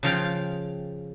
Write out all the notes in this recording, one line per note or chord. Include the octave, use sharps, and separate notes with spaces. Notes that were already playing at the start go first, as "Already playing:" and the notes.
C#3 F3 F5 G5